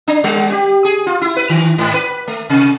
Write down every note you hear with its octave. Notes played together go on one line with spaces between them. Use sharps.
D4
G3
G4
G#4
F4
E4
B4
D#3
G#2
B4
A3
C3